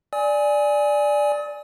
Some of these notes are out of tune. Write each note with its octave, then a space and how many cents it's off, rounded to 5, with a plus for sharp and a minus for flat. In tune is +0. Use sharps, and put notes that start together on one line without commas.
D5 +0 G#5 +0 D#6 +45